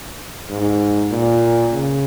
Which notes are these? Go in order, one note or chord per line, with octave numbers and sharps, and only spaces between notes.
G#2
A#2
C#3